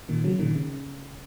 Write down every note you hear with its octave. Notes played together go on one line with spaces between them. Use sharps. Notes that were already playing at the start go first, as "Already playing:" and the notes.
A#2 D#3
C#3 F#3
A#2 D#3
C#3